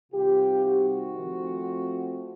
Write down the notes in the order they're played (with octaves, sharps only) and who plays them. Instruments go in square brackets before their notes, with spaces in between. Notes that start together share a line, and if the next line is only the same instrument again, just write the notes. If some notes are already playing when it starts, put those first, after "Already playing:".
[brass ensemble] C3 D#3 G3 C4 F4 G4
F#4
F3 A3 C4